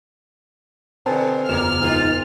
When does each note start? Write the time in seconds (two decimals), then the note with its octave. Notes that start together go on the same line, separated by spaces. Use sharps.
1.06 B2 D3 C4 B4 G#5 A5
1.49 F#1 E2 A2 A#3 F6 E7
1.81 G#2 D#3 F4 G#4